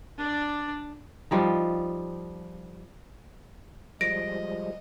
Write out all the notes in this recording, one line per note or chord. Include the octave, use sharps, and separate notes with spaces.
D4 D5
F3 G3 D#4
F3 G3 G#3 D#5 A#6 D7